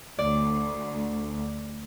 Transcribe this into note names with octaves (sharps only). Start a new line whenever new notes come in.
D2 D5